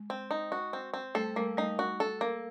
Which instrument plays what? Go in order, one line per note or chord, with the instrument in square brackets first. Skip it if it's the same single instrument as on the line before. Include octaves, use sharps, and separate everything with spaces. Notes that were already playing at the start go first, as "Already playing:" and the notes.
Already playing: [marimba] G#3
[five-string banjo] C4
D#4
F#4
C4
C4
[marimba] G3 A3 [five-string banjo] A4
[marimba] G3 A3 [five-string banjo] A#3
[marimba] G3 A3 [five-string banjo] D#4
[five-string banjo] F#4
A4
A#3